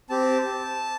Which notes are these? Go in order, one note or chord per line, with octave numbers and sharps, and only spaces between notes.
C4 G4 A5